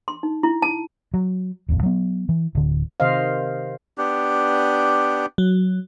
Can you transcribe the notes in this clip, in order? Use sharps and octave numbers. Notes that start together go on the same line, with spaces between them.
C6
D#4
E4
A5
F#3
D#1 A#1 F2
F#3 B3
E3
D1 D3
C3 D#3 C5 D#5 F5
B3 D4 G4
F#3